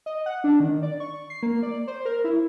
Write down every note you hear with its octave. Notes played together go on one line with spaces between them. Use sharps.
D#5
F#5
D4
D#3
D5
C#6
C7
A#3
D5
C5
A#4
E4